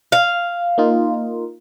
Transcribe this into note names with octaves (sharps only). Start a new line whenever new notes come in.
F5
A#3 D#4 F4